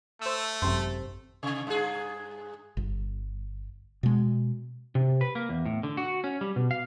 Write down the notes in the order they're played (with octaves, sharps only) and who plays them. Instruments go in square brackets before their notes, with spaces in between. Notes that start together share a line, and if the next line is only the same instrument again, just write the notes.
[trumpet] A3 [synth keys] C5 E6
[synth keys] G#1 C3 C5 [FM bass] F#2
[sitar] C3
G2 G#4
[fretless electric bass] G1
B2 G#3
[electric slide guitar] C3
B4
A#3
E2
A2
D3
F#4
C#4
G3
B2
F5